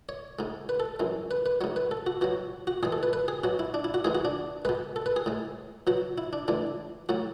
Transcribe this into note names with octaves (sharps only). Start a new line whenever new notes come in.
C#5
G#2 G#3
B4
A4
F#2 E3 G#3
B4
B4
G#2 F#3 C#5
B4
A4
F#4
B2 F#3 F#4
F#4
E2 B2 G#3 G#4
A4
B4
B4
G#4
B2 F#3 F#4
E4
D4
E4
F#4
G#2 E3 G#3 G#4
F#4
D4
B2 G#3 B4
A4
B4
G#4
A2 G#3
B2 F#3 F#4
E4
D4
A2 E3 G#3 D4
A2 F#3 F#4